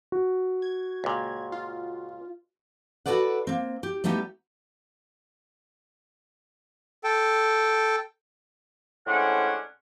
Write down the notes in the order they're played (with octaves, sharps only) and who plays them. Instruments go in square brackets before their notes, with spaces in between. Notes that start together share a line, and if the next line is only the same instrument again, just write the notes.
[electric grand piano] F#4
[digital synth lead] G#6
[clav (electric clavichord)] C#2 A#2
[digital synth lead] F4
[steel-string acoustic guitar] F#4 G4 A4 B4 D5 F#5
A#3 C4
G4
G3 A3 B3 D#4 G4
[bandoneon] A4 G5
[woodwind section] A2 G#3 C#4 D4 C5 F#5